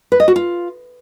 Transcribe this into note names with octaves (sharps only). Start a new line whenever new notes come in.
B4
D#5
F#4
F4